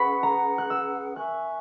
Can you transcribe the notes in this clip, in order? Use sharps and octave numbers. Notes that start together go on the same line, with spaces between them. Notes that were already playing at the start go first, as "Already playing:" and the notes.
Already playing: C#4 G#4 B4 F#5 B5 C#6
A#5
F#6
E6
A#4 E5 G#5 C#6 F#6